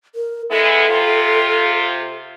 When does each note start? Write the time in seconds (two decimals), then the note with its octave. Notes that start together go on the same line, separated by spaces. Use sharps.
0.15 A#4
0.51 G#3 B3 E4 A4
0.89 C3 F4